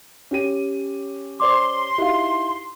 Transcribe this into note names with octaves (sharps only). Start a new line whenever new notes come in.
C#4 G4 D#7
C5 D5 C6 D6
D#4 E4 F#4 G4 F5